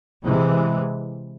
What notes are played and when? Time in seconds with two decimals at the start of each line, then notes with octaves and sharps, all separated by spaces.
0.24 C3 E3 G#3